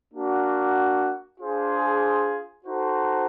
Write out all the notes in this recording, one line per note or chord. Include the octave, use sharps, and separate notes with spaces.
A#3 D4 F#4
D4 F4 G#4 C5
D#4 F#4 A4 C5